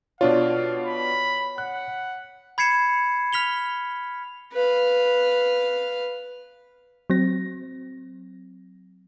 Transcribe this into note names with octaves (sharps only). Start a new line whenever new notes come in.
B2 D4 F4 C#5 F5
B5
F#5 F#6
B5 G#6 C7 C#7 E7
F6 B6 F7 G7
B4 F5
F#3 C4 A#6